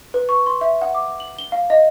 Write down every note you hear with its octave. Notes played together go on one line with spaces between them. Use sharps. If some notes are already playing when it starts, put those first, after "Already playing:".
B4
C#6
C6
E5
F#5
D6
F#7
G7
F5
D#5